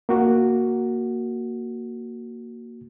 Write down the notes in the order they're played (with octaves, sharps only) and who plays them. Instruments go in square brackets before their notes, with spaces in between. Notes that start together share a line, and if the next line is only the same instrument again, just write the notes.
[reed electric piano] A#3 F#4